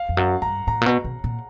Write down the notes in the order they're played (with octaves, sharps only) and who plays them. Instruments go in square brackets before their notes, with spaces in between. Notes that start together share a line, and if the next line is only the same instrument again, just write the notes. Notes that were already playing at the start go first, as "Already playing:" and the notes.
Already playing: [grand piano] F5
[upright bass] F2
[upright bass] F#2 [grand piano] F#5
[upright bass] G2 [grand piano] A#5
[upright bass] A2 [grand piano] A#5
[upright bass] A#2
B2
B2
A#2